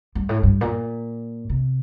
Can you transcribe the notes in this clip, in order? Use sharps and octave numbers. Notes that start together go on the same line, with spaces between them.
G2
A2
G2
A#2
C3